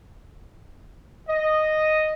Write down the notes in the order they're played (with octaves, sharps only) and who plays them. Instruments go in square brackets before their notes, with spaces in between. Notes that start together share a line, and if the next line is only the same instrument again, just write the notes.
[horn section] D#5